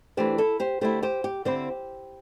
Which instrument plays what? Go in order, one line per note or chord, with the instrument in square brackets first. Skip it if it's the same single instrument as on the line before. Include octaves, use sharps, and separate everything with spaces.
[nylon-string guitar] E3 A3 D4 G4 C5
E4 A4
G4 C5
D3 A3 E4 G4 C5
G4 C5
G4
D3 C4 E4 G4 C5